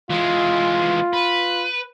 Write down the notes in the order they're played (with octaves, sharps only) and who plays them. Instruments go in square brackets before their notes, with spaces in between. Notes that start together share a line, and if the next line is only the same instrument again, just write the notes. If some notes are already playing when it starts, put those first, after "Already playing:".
[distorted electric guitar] E3 G#3 [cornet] F4
[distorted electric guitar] B4